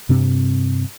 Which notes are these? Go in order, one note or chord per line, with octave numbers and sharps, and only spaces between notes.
G2 C3 C4